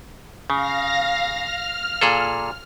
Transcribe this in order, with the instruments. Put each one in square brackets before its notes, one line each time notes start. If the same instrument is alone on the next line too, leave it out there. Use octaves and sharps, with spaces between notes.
[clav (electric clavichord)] C#3 [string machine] F5 A#6
[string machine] F6
[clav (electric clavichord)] A#2 G#4 A4